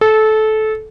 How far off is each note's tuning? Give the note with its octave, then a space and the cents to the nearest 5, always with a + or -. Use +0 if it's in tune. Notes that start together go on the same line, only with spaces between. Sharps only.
A4 -20